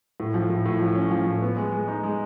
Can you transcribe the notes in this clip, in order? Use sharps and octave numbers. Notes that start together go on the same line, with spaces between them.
A2
F3
A2
A2
F3
C#4
F3
A2
B3
G#3
G#3
D#4
G#3